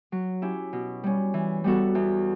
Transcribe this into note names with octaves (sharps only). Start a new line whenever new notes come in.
F#3
C#4 E4 G4
B2
G3 C#4
E3
G3 B3 F#4 A4
E2